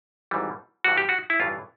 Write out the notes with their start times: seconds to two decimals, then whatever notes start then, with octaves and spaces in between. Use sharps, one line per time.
0.31 G#1 G#2 E3 G3
0.84 G2 E3 G3 F#4
0.97 G4
1.09 F#4
1.30 E4
1.40 A1 G2 E3 F4